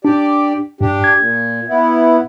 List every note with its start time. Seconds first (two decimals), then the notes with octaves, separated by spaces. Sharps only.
0.05 D4 G4 D5
0.81 G2 D4 G4
1.04 G#6
1.19 A#2
1.68 B3 E4